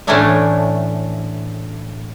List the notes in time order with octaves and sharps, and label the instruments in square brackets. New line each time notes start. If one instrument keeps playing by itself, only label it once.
[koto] A2 E3 A3 C#4 D4 E5